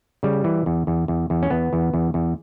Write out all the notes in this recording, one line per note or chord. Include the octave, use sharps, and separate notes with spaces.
C#3 G3
E3
E2
E2
E2
E2
C#4
E2 B3
E2
E2
E2